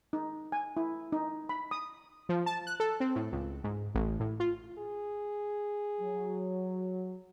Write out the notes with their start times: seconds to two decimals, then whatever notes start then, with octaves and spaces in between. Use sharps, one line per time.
0.13 D#4
0.52 G#5
0.77 E4
1.12 D#4
1.49 B5
1.71 D#6
2.29 F3
2.46 A5
2.67 F#6
2.80 A4
3.00 C4
3.16 A2
3.32 C#2
3.64 G#2
3.95 A1
4.20 A2
4.40 F4
4.78 G#4
6.01 F#3